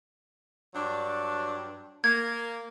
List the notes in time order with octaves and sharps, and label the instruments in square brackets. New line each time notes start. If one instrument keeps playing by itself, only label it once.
[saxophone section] G2 F#3 D4
[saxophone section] A#3 [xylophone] G#6